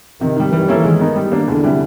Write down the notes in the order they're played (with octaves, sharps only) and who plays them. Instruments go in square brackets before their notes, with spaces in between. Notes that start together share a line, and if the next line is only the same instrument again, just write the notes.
[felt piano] C3 [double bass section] D#3
[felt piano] D#3 G3
[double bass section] E3 [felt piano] G3
[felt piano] A#3 C#4 E4 A4
[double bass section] D#3 [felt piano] G#3
[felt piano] B3 D#4
G3
A#3 D4
[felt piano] E2 [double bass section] D3
[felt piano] C3 E3 G3